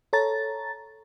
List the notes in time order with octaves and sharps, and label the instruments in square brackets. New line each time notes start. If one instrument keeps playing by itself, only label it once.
[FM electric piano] A4 C#5 A#5 A6